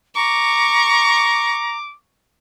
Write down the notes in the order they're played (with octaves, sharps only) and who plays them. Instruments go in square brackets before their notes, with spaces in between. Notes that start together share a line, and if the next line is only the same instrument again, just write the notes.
[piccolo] A#5 [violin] C#6 [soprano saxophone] D6